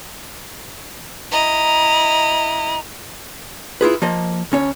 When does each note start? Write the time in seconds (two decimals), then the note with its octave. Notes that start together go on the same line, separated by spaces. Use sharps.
1.32 E4 D#5 A#5
3.81 E4 F4 G#4 B4
4.02 F3 A#3 D#5
4.52 D2 C#4 C#5